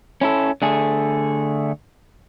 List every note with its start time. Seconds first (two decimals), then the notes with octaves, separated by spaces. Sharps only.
0.21 C#4 E4 A4
0.62 D3 A3 G#4